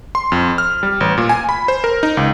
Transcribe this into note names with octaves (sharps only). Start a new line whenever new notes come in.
C6
F2
F6
G3
A1
A#2
G#5
B5
C5
A#4
D#4
C#2